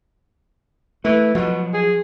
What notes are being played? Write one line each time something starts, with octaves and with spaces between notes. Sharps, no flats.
E3 A3
B2 F3 F#3
G#4